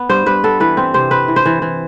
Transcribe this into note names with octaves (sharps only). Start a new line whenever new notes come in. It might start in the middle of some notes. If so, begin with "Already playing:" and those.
Already playing: B3
G2 C5
G2 B4
B3 A4
E3 B4
C4
C3 C5
C4 B4
E3
C5
E3
E3